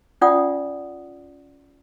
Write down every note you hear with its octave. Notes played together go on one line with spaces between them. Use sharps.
C#4 F4 D5 F#5 D#6